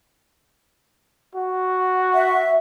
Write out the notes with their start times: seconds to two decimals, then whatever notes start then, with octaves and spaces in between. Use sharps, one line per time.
1.35 F#4
2.14 E5